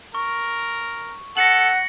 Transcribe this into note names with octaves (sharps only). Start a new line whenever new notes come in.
A#4 C#6
A4 F#5 A#6 C#7 F#7